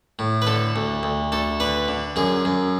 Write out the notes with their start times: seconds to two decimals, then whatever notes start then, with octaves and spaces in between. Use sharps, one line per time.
0.19 A2
0.42 B4
0.47 D3 A4
0.76 D2
1.03 D2
1.32 D2 A4
1.60 D3 B4
1.88 D3
2.16 F#2 G#4
2.45 F#2